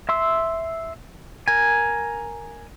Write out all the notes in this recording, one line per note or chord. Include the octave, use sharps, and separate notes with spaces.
E5 C6 E6
A#4 G#5